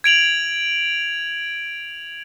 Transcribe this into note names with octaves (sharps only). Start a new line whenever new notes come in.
G#6 D7 F7 F#7